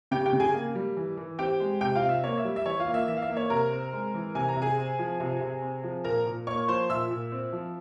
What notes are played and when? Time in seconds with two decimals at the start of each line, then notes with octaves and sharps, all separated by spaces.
0.11 C#3 G4 G5
0.25 G4 G5
0.33 C#3
0.40 G#4 G#5
0.54 A#3
0.75 G3
0.97 E3
1.17 E3
1.38 C4 G4 G5
1.60 G#3
1.81 C3 G4 G5
1.95 F4 F5
2.02 C3
2.09 E5
2.23 A#3 C#5
2.37 E5
2.45 G3
2.56 E5
2.66 E3 C#5
2.80 F4 F5
2.87 A#3
2.94 E5
3.08 E3 E5
3.17 F5
3.22 E5
3.29 A#3
3.37 C#5
3.50 C3 A#4 A#5
3.72 C4
3.93 G#3
4.14 E3
4.35 C3 G#5
4.49 A#5
4.56 C3
4.62 G#4 G#5
4.78 C4
4.99 F3
5.20 C3
5.41 C3
5.62 C4
5.83 F3
6.04 A#2 A#4 A#5
6.26 A#2
6.47 A#3 C#5 C#6
6.68 F3 C5 C6
6.89 A#2 E5 E6
7.10 A#2
7.32 C4
7.52 F3